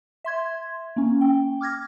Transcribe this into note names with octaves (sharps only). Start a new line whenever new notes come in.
E5 C6 G#6
A#3 C#4
G5
D6 F6 G#6 A#6